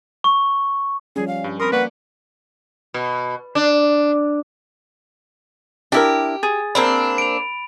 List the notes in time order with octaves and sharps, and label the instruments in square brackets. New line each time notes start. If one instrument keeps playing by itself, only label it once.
[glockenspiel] C#6
[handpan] F3 G3 C#4 [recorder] G#4
[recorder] F5
[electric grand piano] G2
[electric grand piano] C4 B5 C6 [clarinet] A#4 [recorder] D#6
[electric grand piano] A#3 D5 C#6 [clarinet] B4 [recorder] F#5
[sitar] B2
D4
[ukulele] D4 E4 A#4 [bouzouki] G4
[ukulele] G#4 [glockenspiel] A6
[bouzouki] A#3 C4 D4 [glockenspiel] B5
[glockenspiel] D7 F7